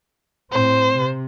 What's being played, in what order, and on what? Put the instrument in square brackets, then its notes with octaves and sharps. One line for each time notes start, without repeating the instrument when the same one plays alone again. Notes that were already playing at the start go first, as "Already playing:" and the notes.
[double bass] A2 C4 [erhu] C5
[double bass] C3